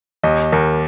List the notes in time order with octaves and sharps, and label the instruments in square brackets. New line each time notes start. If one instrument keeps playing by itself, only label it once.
[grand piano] D#2 [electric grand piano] D#5
[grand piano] D#2 [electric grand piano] A#4